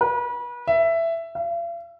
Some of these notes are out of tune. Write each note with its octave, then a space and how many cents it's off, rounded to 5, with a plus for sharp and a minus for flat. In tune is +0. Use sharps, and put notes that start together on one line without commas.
B4 -35
E5 +10
F5 -45